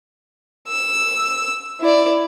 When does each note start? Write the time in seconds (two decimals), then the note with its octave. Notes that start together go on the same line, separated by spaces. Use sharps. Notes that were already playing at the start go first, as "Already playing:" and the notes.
0.68 E6
1.80 E4 D5